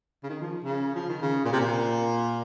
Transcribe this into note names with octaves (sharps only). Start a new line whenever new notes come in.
C#3
D#3
F3
C#3
F3
D#3
C#3
A#2
C3
A#2